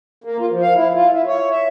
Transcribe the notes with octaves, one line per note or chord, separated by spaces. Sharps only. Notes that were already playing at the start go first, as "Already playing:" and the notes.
A#3
F4
F3
F5
E4
F4
E4
C#5
E5